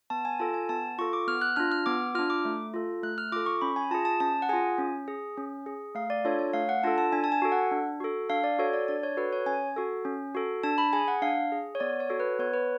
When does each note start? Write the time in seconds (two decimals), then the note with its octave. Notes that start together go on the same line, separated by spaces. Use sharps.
0.10 B3 A5
0.25 G#5
0.39 F4 A4 A5
0.54 G#5
0.69 B3 A5
0.98 F4 A4 C#6
1.13 D6
1.27 B3 F6
1.41 F#6
1.56 D4 F4 F6
1.72 F6
1.86 B3 D6
2.15 F4 F6
2.19 D4
2.30 D6
2.45 A3
2.74 F4 A4
3.03 A3 F#6
3.18 F6
3.32 F4 D6
3.36 A4
3.46 C#6
3.61 C#4 B5
3.76 G#5
3.91 F4 A5
3.94 G#4
4.05 A5
4.20 C#4 A5
4.42 F#5
4.49 F4 G#4 G#5
4.78 C#4
5.08 G#4
5.37 C#4
5.66 G#4
5.95 A3 F5
6.10 D5
6.25 D4 F4 A4 C#5
6.39 C#5
6.53 A3 F5
6.69 F#5
6.83 D4 F4 A4 A5
6.98 A5
7.12 D4 G#5
7.24 A5
7.32 G#5
7.42 F#4 A4
7.52 F#5
7.71 D4
8.00 F#4 A4
8.30 D4 F5
8.44 D5
8.59 F#4 A4 C#5
8.73 D5
8.88 D4 D5
9.03 C#5
9.17 F#4 A4 B4
9.33 C#5
9.46 C#4 G#5
9.76 F#4 A4
10.05 C#4
10.35 F#4 A4
10.63 D4 A5
10.78 B5
10.93 G#4 G#5
11.08 F#5
11.22 D4 F5
11.52 G#4
11.75 C#5
11.80 B3 D5
12.00 C#5
12.10 F#4 A4
12.20 B4
12.39 B3 C#5
12.54 B4